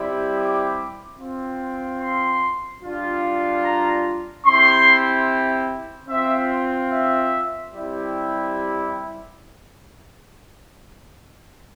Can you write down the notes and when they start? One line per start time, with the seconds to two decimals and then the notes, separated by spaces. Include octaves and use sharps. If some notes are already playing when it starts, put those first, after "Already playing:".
Already playing: G3 C4 E4 G4
0.37 D6
1.18 C4 F4
2.00 C6
2.82 G3 D4 F4
3.64 A#5
4.46 C4 E4 G4 C6
6.09 C4 F4 E5
6.91 E5
7.73 G3 C4 E4 G4